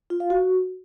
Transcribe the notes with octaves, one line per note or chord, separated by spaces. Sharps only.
F4
F5
F#4